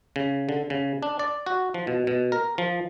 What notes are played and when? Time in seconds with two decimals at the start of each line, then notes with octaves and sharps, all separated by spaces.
0.16 C#3
0.49 D3
0.70 C#3
1.03 D4
1.19 D5
1.46 F#4
1.74 F3
1.87 B2
2.07 B2
2.32 A#4
2.58 F3